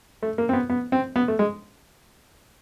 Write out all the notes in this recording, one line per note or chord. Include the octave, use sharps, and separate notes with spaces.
A3
A#3
C4
B3
B3
C4
B3
A3
G#3